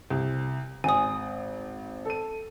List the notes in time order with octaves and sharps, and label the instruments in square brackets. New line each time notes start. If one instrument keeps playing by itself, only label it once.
[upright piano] C2
[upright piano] G#1 [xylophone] G#5 D#6
[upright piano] A4 D#7